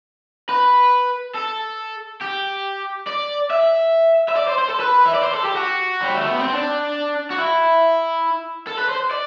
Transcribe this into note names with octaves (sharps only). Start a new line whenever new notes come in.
B4
A4
G4
D5
E5
E5
D5
C5
C5
A4
B4
E5
D5
C5
A4
G4
F#4
G3
A3
B3
C4
D4
F#4
E4
A4
B4
C5
D5